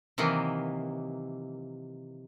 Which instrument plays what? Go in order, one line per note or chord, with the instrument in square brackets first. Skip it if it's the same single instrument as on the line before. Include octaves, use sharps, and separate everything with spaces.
[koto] C3 D#3 E3 F#3 A#3